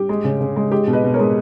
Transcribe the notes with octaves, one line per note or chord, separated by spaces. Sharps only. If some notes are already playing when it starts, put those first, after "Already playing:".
Already playing: G3 G4
G#3
C#3
C#3
G#3
G#3 G4
B2
B4 D#5
B2
A#4 C#5
G#3